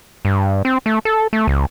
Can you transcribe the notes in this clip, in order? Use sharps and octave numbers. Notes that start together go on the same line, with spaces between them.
G2
C4
A3
A4
A3
C#2